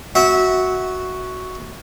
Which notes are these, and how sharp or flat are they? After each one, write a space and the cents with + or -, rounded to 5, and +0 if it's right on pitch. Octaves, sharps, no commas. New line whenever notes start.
F#4 +0 E5 -20